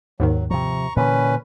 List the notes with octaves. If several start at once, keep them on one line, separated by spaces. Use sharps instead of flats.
D#2 G#2 D#3 F#3
C3 F3 A#5 C#6
A#2 D3 E3 C#4 B4